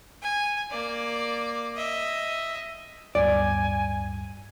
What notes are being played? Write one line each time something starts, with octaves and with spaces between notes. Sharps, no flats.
G#5
A#3 D5
D#5 E5
D1 G2 B3 D5 G#5